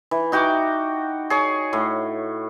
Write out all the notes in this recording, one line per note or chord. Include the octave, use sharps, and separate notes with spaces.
E3
D#4 F#4 G5 D6
G#4 C#5
A2